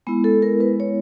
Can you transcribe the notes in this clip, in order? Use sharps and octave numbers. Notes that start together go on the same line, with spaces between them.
G#3 B3 E4
A4
A#4
B4
C#5